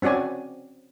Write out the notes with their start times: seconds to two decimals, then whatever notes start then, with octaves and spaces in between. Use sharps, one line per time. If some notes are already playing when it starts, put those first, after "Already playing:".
0.02 C4 C#4 F#4 D5 G#5